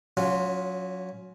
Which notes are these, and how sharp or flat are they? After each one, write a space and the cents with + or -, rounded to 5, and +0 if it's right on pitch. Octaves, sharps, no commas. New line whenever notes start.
F#3 -20 C#4 +20 F4 +0